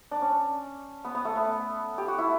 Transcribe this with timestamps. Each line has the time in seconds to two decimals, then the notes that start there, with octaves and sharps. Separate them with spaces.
0.11 D4
0.21 C#4
1.05 B3
1.15 B3
1.25 A3
1.36 B3
1.98 G4
2.08 F#4
2.18 E4